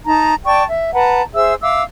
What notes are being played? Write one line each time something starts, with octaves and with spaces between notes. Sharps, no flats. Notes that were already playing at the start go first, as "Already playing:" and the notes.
D#4 A5 A#5
D5 G5 A5 C#6
E5
B4 F#5 A5 A#5
G#4 C5 E5 E6
E5 F5 D6 E6